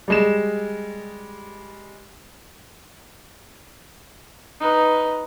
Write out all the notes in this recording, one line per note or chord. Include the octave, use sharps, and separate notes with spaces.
G3 G#3 E7
D#4 B4